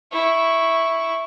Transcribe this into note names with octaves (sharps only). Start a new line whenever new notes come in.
E4 C#6